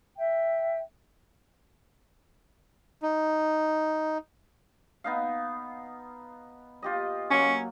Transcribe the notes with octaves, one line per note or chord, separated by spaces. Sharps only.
E5 G5
D#4
B3 D#4 F5
F4 G4 D#5
F#3 A#3 C#4